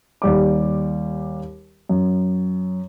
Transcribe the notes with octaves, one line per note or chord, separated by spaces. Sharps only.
D#2 G3 D6
F#2